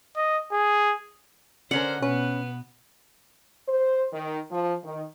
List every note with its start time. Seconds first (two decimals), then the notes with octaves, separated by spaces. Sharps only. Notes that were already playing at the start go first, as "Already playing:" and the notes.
0.16 D#5
0.52 G#4
1.71 D3 C#4 A#4 C5 F#5
2.02 B2 B3 C#4 B4
3.68 C5
4.13 D#3
4.51 F3
4.84 D#3